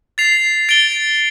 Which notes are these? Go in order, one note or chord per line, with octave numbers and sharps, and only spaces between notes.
A6 C7 F7
A6 D7 G7